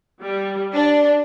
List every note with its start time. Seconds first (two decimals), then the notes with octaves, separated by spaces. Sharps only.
0.22 G3
0.73 D4